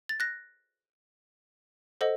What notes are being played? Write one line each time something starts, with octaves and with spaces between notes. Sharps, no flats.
A6
F#6 A#6
A4 C5 D#5 F#5